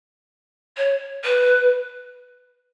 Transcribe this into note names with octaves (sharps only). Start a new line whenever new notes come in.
C#5
B4